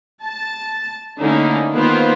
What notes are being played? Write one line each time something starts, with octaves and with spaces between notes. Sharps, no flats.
A5
D3 A3 A#3 C#4 D#4 E4
D#3 A#3 B3 F4 C5